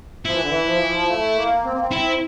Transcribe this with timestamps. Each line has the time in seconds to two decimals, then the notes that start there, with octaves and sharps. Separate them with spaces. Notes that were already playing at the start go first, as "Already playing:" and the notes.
0.25 F3 E4
0.33 E3
0.42 D3
0.50 E3
0.67 F3
0.77 E3
0.87 F3
1.08 A3
1.36 A#3
1.64 C4
1.72 A#3
1.81 C4
1.91 C4 E4